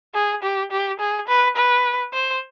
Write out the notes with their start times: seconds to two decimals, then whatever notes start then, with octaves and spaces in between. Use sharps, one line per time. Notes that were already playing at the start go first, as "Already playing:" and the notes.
0.15 G#4
0.43 G4
0.71 G4
1.00 G#4
1.28 B4
1.56 B4
2.13 C5